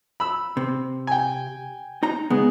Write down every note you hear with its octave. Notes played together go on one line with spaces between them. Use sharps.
B5 E6
C3
G5 G#5
D#4 A#5
C#3 G#3 B3